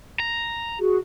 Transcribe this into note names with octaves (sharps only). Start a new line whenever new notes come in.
A#5
F#4 G#4